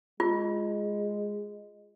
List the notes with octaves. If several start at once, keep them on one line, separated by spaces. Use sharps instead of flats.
G#3 F4